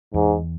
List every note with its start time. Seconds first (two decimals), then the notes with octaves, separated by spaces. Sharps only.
0.14 E2 G#2